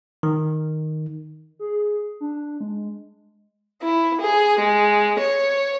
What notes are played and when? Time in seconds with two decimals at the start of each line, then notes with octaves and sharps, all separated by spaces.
0.23 D#3
1.59 G#4
2.20 D4
2.61 G#3
3.82 E4
4.20 G#4
4.59 G#3
5.19 C#5